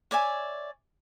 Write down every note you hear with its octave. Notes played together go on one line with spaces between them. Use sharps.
C#5 D5 E5 G#5